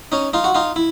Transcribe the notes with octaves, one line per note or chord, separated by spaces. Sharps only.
C#4 D#4
D#4 F4
F#4
D#4 F4
E4